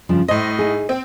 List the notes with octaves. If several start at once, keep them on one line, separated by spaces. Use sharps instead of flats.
G2 C#3 F3
A2 C5 D#5
D#4 G#4
C4